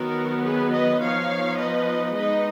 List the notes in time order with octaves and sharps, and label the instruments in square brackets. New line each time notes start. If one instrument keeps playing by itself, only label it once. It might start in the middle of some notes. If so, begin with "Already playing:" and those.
Already playing: [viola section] D#3 F#3 B3 F#4 A#4
G#4 B4
B4 D#5
F3 B3 D#4 C#5 F5
B4 D#5
G#3 D#4 B4 D#5